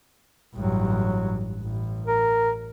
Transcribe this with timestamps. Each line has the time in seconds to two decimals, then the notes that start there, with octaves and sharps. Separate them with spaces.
0.54 A1 G2 F#3
1.62 A1
2.07 A#4